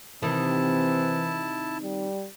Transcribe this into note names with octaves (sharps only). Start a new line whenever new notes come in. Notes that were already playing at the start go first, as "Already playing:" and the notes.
C3 D#3 E3 C4 E4 A5
G3